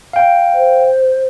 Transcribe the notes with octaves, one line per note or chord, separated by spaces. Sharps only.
F5 G5
C5